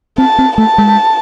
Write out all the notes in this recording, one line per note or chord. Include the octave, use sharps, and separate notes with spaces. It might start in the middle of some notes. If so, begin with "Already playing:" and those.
C4 A5
C4
A3 A5
G#3